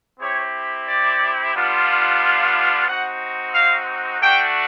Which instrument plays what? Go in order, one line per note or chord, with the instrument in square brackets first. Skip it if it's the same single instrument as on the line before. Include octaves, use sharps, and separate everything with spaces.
[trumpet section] C4 E4 G4 C#5
D5
G3 B3 D4 F4
F5
C4 D#4 F#4 F#5
F5
A3 D4 F#4 G5